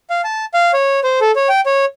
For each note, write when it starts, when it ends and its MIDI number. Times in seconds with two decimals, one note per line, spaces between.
0.10 0.21 77
0.24 0.45 81
0.54 0.72 77
0.73 1.00 73
1.04 1.19 72
1.21 1.31 69
1.36 1.49 73
1.49 1.61 79
1.66 1.85 73